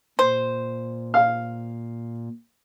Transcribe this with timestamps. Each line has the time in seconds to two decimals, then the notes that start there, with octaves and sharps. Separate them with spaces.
0.19 A#2 C5
1.14 F5